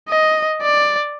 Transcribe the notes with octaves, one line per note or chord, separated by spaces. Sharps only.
D#5
D5